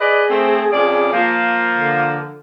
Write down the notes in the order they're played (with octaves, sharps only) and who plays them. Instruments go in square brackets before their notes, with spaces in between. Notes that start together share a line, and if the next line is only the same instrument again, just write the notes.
[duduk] G#4 [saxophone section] B4 D5 D#5
[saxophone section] A3 C4
F2 C#3 D5
F3 A#3
[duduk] D3